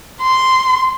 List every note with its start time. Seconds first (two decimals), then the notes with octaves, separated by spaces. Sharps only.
0.22 C6